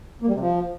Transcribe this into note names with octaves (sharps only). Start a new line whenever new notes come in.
A#3
G3
C3
F3